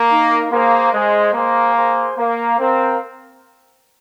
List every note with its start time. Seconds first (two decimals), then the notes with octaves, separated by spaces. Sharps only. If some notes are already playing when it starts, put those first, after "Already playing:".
Already playing: A#3
0.10 D#4 A#4 F5
0.51 A#3 G#4 C5 G#5 C6
0.93 G#3 G#4 C5 G#5 C6
1.34 A#3 G#4 C5 G#5 C6
1.76 G#4 C5 G#5 C6
2.17 A#3 A#4 F5 A#5
2.59 C4 A#4 F5 A#5